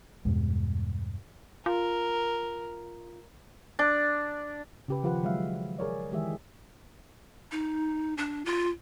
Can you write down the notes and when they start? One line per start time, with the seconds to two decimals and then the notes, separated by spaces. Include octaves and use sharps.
0.25 E2 G2 B2 G#3
1.66 F4 A#4
3.79 D4
4.88 C#3 G4 B4
5.03 D#3 F3 F4 G4 B4 F#5
5.23 F#3 G#3 E5 F5
5.79 G#4 A#4 C#5 D5
6.11 D#3 E3 G#3 G4 G#4 E5
7.52 D#4
8.18 D4
8.45 F4